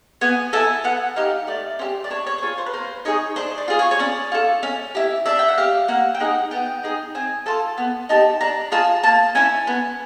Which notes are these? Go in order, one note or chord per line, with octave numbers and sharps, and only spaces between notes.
B3 G#5
E4 A4 G#5
B3 F#5
D#4 G4 F5
A3 D5
C#4 E4 G4 C5
D5
D4 C#5
C#5
C5
F4 G#4 C#5
C5
B4
A#3 C5
D#4 G#4 C#5
D4 C5
D5
F4 G#4
C#5
C#5
C#4 D5
F4 A4
C#4
E4 G4
D4 E5
G5
F#5
G4 F5
A#3 F#5
G5
D#4 G#4 F#5
B3 G5
D#4 G#4
C4 G#5
F4 A4 A5
B3
D#4 G4 A5
D4 A#5
F4 G#4 A5
A#3 A5
C#4 E4 G#5
B3